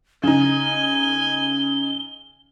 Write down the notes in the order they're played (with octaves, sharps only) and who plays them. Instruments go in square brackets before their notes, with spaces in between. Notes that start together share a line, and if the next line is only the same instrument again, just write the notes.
[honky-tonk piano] C#3 D#4 [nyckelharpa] G#5 [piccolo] G7